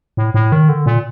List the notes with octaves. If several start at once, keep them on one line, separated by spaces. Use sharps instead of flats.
A2
A2
D#3
D3
A#2